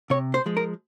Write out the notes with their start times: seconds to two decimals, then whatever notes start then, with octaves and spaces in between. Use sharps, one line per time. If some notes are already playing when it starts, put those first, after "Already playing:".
0.10 C3 C#5
0.34 C5
0.46 F3 G#3
0.57 A#4